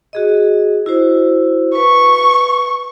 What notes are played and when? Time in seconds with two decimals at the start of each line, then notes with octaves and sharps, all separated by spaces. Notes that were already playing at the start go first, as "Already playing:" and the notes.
0.13 F#4 G#4 D#5
0.86 E4 F#4 C5
1.75 B4 C#6